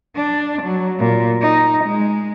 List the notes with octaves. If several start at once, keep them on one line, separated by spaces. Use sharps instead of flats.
D4
F#3
A#2
D#4
G#3